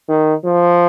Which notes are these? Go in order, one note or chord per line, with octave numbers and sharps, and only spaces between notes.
D#3
F3